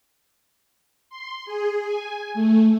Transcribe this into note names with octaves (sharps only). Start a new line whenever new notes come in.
C6
G#4
G#5
A3